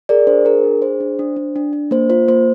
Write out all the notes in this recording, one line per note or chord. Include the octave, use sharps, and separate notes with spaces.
G#4 A#4 D5
D4 C5
G#4 A#4
D4
G#4 C5
D4
D4
D4
D4
D4
A#3 C5
F4 C5
A#3 C5